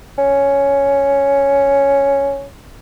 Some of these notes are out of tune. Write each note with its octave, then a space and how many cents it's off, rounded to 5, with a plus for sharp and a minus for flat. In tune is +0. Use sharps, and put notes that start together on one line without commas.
C#4 +5